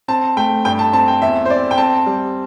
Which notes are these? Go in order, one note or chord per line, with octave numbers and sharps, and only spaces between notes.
C4 A5
A3 G5
G2 G5
A5
C4 A5
G5
E2 E5
C5
C4 D5
G5
C4 A5
G3